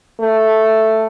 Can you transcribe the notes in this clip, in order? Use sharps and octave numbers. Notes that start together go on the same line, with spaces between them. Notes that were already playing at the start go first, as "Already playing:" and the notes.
A3